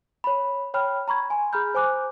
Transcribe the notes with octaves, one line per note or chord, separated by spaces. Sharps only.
C#5 B5
C#5 G5 B5 F6
A#5 B5 C#6 G#6
G#5 C6
G#4 A#5 B5 F6 G6
C5 G#5 D6 F#6